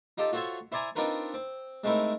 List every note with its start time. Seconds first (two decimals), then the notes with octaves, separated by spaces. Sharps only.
0.18 D#4 F4 G4 A4
0.32 F4 F#4 A4 C5 C#5 E5
0.72 E4 C5 D5 G#5 A#5
0.96 C4 D4 D#4 F4 A#4 B4
1.34 C4
1.84 G#3 A3 C4 D#4 E4 A#4